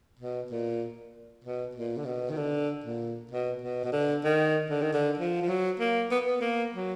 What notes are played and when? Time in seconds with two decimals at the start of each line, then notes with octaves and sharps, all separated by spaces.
0.19 B2
0.51 A#2
1.44 B2
1.75 A#2
1.97 D3
2.05 B2
2.30 D#3
2.37 D3
2.84 A#2
3.31 B2
3.62 B2
3.84 B2
3.93 D3
4.24 D#3
4.70 D3
4.82 D#3
4.93 D3
5.18 F3
5.42 F3
5.48 F#3
5.80 A#3
6.11 B3
6.26 B3
6.41 A#3
6.74 F#3